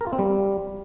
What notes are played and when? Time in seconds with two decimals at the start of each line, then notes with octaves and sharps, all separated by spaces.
0.01 A#4
0.07 F4
0.13 C4
0.19 G3